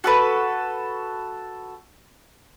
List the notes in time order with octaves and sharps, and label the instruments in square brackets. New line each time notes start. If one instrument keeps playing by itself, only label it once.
[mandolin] F#4 A4 B4